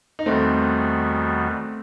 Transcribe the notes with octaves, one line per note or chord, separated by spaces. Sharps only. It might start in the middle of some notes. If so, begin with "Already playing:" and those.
D#4
E2 D#3 G3 A3 B3 C4 F#4